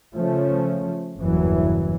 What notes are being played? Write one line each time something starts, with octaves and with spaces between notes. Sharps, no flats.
C#3 F3 A3 C#4
F#1 E2 G2 E3 F#3